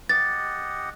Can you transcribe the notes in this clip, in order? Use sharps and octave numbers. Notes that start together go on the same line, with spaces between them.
G4 D#5 F#5 A6